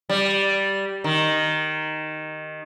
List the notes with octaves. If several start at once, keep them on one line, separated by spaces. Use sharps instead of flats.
G3
D#3